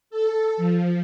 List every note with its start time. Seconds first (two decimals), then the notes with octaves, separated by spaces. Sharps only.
0.10 A4
0.57 F3